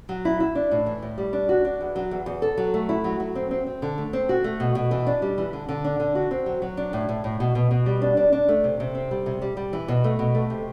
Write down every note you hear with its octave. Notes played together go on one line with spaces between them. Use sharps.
F#3
E4
E4
D4
A2
E3
A2
G3
D4
F#4
D4
E2
F#3
E2
E2
A4
F#3
A3
E4
F#3
F#3
C4
C4
C4
D3
A3
C4
F#4
A3
B2
B2
E3
D4
G3
E3
D3
D3
D4
D3
F#4
C4
F#3
F#3
D4
A2
A2
A2
B2
B2
B2
G3
D4
D4
D4
A3
C3
C3
C4
G3
C3
G3
G3
E3
B2
A3
B2
A3
C3